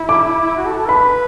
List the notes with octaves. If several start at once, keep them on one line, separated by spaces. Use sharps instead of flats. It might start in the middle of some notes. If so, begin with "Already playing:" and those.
Already playing: E4
D6
F#4
A4
A4
B4 B5